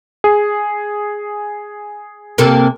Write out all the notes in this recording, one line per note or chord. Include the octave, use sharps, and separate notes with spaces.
G#4
C3 A#3 A4